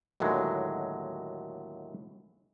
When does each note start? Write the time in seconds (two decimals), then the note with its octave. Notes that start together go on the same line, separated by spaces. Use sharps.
0.20 D#2 A2 D3 F#3 G#3